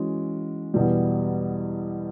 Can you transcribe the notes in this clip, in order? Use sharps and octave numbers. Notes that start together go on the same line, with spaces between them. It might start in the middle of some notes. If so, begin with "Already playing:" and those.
Already playing: E3 G#3 C#4 F#4
E2 B2 G3